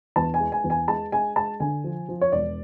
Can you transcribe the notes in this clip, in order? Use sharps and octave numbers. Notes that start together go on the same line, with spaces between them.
E2 A5
G#5
G#3
G#5
E2
G#5
G#3 A5
G#3 G#5
G#3 A5
D3 G#5
F3
F3
C#5
E1 D5